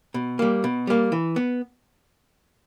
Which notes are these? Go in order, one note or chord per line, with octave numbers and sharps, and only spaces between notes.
B2
G3 A#3
B2
G3 A#3
E3
B3